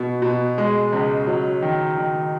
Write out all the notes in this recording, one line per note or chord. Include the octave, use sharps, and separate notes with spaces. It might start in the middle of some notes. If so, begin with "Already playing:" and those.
Already playing: B2
B2
G#3
C#2
F#3
D#3
D#3